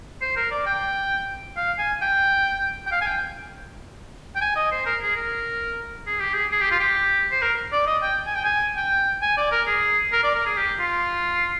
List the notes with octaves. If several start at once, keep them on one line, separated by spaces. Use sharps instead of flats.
C5
A#4
D5
G5
F5
G#5
G5
G5
F5
G#5
G5
G5
G#5
D#5
C5
A#4
G#4
A#4
G#4
G4
G#4
G#4
G4
F4
G4
C5
A#4
D5
D#5
G5
G#5
G5
G#5
G5
G#5
D5
A#4
G#4
A#4
D5
A#4
G#4
G4
F4